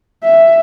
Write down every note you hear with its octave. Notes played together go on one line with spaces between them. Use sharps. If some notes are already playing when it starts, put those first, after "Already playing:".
E5